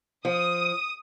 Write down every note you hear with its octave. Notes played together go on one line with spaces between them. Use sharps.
F3 D#6